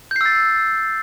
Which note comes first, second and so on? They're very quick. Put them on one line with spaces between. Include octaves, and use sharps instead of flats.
G6 C7 E6 A6